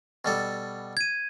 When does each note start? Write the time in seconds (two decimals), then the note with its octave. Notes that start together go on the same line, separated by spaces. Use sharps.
0.25 B2 G3 A4
0.97 G#6 D#7